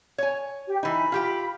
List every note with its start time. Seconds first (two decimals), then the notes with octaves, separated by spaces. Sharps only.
0.18 C#5 G#5
0.67 G4
0.83 E3 D#4 B5
1.12 F4 G4 G5